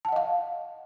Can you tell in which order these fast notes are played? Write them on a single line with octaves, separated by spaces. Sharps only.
A5 F#5 D#5 F5